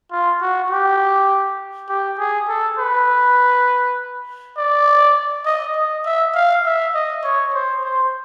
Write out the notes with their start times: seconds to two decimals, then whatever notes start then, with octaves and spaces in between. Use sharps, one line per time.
0.11 F4
0.41 F#4
0.71 G4
1.89 G4
2.19 G#4
2.48 A4
2.78 B4
4.57 D5
5.46 D#5
5.75 D#5
6.06 E5
6.35 F5
6.66 E5
6.94 D#5
7.24 C#5
7.54 C5
7.84 C5